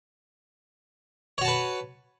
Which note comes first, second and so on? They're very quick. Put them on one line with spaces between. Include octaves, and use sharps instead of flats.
C#5 F#4 A5 B4